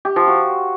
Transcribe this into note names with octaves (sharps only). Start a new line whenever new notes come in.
G4
F3
F#4